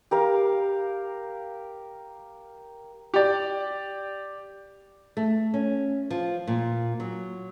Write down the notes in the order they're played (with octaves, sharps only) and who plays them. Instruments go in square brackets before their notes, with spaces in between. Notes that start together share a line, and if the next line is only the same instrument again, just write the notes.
[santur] G4 A#4 F5
[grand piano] G4 D5
[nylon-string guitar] A3
C#4
F3
A#2
F#3